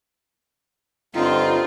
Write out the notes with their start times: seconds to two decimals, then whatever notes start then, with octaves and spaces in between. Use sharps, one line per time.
1.15 G2 D3 C4 D#4 F4